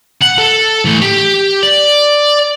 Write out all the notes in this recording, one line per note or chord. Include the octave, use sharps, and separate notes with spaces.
F#5
A4
E3 A3
G4
D5